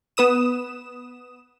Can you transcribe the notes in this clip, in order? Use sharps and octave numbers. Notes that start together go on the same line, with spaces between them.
B3 B4 D#6 E7